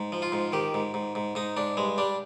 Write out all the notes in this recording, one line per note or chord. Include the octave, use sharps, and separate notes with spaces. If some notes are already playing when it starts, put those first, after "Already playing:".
Already playing: G#2
F3
F4
G#2
D#3 G4
G#2
G#2
G#2
G#2 D#4
G#2 D4
G2 G#3
G3 D4